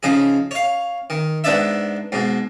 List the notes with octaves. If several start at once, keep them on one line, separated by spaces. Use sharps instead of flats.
C#3 F3 D#4 G#4
C#5 F5
D#3
G#2 B3 D4 D5 E5
G#2 B2